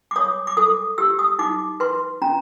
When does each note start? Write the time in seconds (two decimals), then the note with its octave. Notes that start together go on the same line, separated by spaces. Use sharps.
0.11 D6
0.16 C#5 D#6
0.47 D6
0.57 A4 D#6
0.98 G4 E6
1.19 D#6
1.39 D#4 D6
1.80 B4 C6
2.22 C#4 A#5